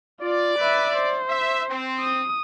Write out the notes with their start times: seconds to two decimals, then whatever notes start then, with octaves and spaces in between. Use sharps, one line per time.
0.21 F4 D5
0.59 B4 E5
0.97 C5
1.28 E5
1.68 C4
2.00 D#6